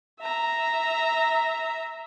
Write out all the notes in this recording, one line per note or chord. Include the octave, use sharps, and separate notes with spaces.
E5 A#5